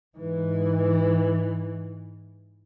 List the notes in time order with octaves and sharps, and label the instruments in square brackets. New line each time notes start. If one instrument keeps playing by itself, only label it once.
[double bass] G#2 E3